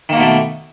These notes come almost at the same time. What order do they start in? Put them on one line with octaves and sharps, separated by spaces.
D#3 A#3 B2 A3